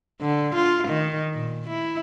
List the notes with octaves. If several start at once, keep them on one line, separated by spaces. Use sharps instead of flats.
D3
F4
D#3
A#2
E4